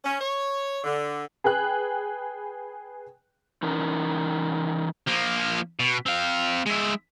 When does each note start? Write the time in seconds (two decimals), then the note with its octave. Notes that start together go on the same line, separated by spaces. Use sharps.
0.05 C#4
0.21 C#5
0.84 D3
1.44 G#4 B4 G5 F#6
3.63 E3 C#4 D#4 A#4
5.07 F3 A#3
5.80 B2
6.06 C4 F5
6.66 G#3 E4